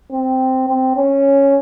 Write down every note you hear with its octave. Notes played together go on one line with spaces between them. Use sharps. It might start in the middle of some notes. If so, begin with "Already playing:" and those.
C4
C4
C#4